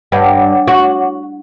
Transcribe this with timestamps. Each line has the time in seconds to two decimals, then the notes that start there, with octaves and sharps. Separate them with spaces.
0.12 G2 C#5 F#5 D6
0.68 F#4